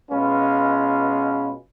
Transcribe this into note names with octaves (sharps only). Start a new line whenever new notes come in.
B2 G#3 C#4 F4 B4